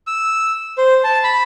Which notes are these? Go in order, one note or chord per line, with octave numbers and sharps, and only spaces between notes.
E6
C5
A5
B5